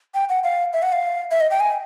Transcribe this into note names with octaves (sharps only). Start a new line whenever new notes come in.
G5
F#5
F5
E5
F#5
F5
E5
D#5
G5
G#5